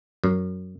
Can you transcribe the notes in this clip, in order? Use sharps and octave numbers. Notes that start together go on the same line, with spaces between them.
F#2